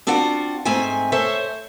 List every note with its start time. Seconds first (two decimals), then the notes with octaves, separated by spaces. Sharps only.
0.07 C4 D4 F4 F#4 F#5
0.65 G#2 A3 C4 E5 G#5
1.12 A4 C5 C#5 E5